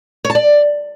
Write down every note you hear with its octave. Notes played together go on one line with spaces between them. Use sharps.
C#5
A5
D5